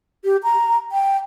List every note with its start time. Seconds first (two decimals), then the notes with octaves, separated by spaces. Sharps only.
0.25 G4
0.43 A#5
0.92 G5